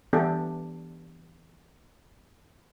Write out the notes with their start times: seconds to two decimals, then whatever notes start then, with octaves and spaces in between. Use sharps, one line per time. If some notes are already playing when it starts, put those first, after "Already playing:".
0.13 E3 B3 D4 G4 A4